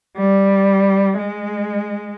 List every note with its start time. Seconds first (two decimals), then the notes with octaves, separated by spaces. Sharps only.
0.18 G3
1.18 G#3